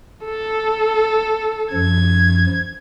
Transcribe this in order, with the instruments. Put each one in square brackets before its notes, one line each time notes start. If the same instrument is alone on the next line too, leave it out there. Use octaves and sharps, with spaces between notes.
[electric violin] A4
[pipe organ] F#2 F3 [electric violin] G#6